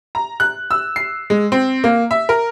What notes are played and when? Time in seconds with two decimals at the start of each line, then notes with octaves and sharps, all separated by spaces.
0.15 A#5
0.40 F#6
0.71 E6
0.96 C7
1.30 G#3
1.52 C4
1.84 A#3
2.11 E5
2.29 A#4